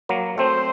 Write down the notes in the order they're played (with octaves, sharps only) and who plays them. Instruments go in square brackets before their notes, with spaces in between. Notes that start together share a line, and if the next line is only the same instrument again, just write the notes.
[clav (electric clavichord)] F#3 A#3
[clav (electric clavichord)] A3 C4 [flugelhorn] C5